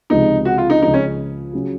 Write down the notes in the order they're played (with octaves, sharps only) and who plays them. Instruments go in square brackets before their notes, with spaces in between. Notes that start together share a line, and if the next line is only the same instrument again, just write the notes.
[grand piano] C#2 C3 F3 G#3 [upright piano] D#4
[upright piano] F#4
F4
D#4
[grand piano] C#2 C#3 F3 [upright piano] D#4
[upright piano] C#4
[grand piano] C#3 F#3 C#4 F#4